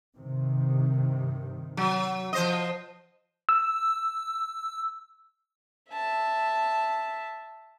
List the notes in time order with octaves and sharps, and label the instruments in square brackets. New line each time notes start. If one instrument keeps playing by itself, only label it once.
[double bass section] G2 C3 D#3
[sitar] F#3
F3 C5 D#5
[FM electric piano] E6
[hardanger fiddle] E5 A5